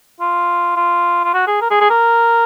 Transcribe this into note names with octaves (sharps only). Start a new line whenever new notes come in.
F4
F4
F4
F#4
G#4
A#4
G#4
G#4
A#4